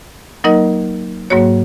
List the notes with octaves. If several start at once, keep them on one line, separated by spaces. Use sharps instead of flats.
F#3 A#3 D#4 A#4 D#5
G#2 F#3 A#3 F#4 C#5